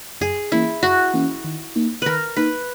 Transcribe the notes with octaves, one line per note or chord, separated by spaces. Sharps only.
F#2 G#4
E3 A#3 C#4 E4
F#2 F#4
E3 A#3 C#4
D#3
A#3 D#4
D#3 A#4 B4
A#3 D#4 B4